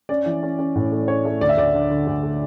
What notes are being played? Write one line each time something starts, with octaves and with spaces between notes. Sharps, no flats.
C#4 D5
E3
C#4
C#4
A2
A3
C#4 C#5
A3
D2 D5
E5
D2 D5
D3
D3
D2
A3